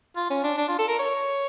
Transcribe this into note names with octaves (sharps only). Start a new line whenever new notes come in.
F4
C#4
D4
D4
F4
A4
A#4
C#5